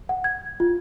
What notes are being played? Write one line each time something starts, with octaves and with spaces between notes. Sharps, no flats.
F#5
G#6
F4